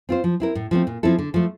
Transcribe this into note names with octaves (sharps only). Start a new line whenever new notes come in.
C4 F4 C5
F3
C4 E4 A#4
A2
F3 A3 C4
A#2
F3 C4 E4 A4
D3
F3 A3